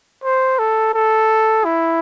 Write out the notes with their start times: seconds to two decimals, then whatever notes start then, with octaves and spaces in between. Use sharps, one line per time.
0.24 C5
0.59 A4
0.94 A4
1.65 E4